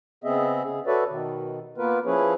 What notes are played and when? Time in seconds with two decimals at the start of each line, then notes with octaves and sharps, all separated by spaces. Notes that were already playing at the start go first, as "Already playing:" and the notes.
0.24 C#3 B3 C4 G#4 D#5 E5
0.64 C#3 G#4
0.87 F#4 A4 B4 C#5 D5 E5
1.09 B2 D#3
1.78 A#3 B3 F4 A#4 B4
2.06 F3 C#4 E4 G#4 B4 C#5